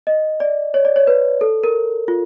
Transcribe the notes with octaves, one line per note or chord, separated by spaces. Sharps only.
D#5
D5
C#5
D5
C#5
B4
A4
A#4
F4